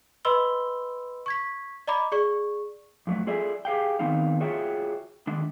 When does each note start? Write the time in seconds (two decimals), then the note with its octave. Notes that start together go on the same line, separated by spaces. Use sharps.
0.25 B4 D#5 B5 C6 E6 G7
1.26 C#6 G#6 B6
1.87 D5 D#5 A#5 B5 D6
2.12 G#4 D5 C#6
3.07 F2 F#3 A3
3.27 F4 G#4 A4 D5 E5 G#5
3.65 G4 G#4 F5 G5
3.99 D#3 B3 C4 D#4 F5
4.40 F4 F#4 G#4 C#5 E5 G5
5.27 D#3 G#3 D4